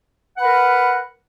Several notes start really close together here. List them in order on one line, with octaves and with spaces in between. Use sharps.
F#5 B4 B5 A#4